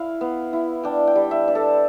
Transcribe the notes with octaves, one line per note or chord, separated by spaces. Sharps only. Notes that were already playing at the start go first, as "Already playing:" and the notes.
Already playing: E4 F5
B3
E4
D4 G5
G5
G3
E5
D4
A4